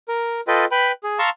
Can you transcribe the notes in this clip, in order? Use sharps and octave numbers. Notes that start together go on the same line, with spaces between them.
A#4
F4 A4 B4 D#5 G5
B4 G5 B5
G#4
F5 A5 A#5 C6 C#6 E6